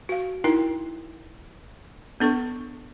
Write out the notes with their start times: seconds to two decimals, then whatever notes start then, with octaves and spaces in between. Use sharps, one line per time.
0.09 F#4 F5
0.44 D#4 E4 A#4 G5
2.20 B3 D4 A4 C#6